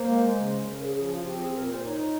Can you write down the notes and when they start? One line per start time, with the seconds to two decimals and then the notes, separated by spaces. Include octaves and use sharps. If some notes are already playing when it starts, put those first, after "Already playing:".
Already playing: A#3 C5
0.09 G#3
0.38 C#3
0.66 C#3 A#4
0.82 G#4
0.96 F3 G#4
1.11 F4
1.25 C4 G4
1.40 G#4
1.55 A#2 A#4
1.69 C5
1.84 D#4 C#5